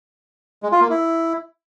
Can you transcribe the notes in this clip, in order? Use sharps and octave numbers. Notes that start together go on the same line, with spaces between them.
G#3
F4
A#3
E4